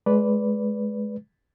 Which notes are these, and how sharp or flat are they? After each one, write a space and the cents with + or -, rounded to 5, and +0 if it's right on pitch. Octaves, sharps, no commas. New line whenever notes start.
G#3 +20 B4 +0 D5 -15